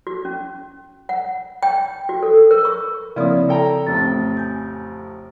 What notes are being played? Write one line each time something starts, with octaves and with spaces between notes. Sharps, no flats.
F#4
C#4
F#5
G5
F#4
A4
A#4
C#6
C#3 F3 A#3 C4 E4 D5 D#6
A4 G5 A#5
A1 F2 A6
G#5 G6